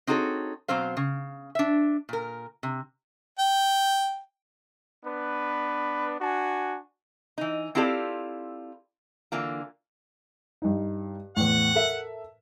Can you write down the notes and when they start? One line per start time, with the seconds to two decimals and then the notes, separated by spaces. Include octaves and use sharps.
0.07 C4 D#4 F#4 G#4 A4 C#5
0.68 B2 F#3 C4 C5 F5
0.97 C#3
1.55 D4 E5
2.09 A#2 A#4
2.63 C3
3.39 G5
5.06 B3 D4 B4
6.21 D4 F#4 G#5
7.38 E3 D#4
7.75 C4 E4 F4 G4 A4 D5
9.32 D3 E3 A#3 F4
10.62 G2 D#4
11.37 E2 A2 F#5
11.75 A4 A#4 E5